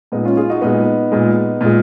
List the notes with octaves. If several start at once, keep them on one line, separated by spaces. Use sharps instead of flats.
A#2 G#3 B3 D#4
C#4 F4
F4 G#4
D#4 F#4
A#2 G#3 B3 D#4
A#2 G#3
A#2 G#3